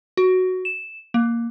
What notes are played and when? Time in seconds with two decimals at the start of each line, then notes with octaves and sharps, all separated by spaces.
0.17 F#4
0.65 E7
1.14 A#3